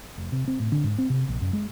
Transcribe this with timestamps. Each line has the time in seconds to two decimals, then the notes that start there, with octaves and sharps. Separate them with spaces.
0.18 F1
0.32 C3
0.48 C4
0.60 A2
0.72 D3
0.84 G#2
0.98 C4
1.10 C3
1.29 A#1
1.41 F#2
1.53 G#3